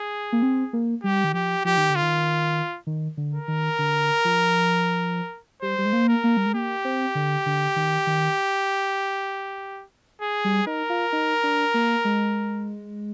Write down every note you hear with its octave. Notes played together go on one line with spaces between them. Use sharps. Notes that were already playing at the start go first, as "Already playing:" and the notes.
Already playing: G#4
A#3
C4
A#3
G3 G4
D#3
F3 G4
F3 G4
D#3
D3
F4
D#3
D#3
D3
A#4
D#3
D3
F3
G3 C5
G3
G#3
A#3
A#4
A#3
G3
G#3
A#3 G4
C4
D3
D3
D#3
D#3
G#4
G3
D#4 A#4
F4
D#4
D4
A#3
G#3